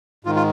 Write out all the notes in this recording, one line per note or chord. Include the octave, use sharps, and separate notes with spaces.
G#2 D#3 F4
F4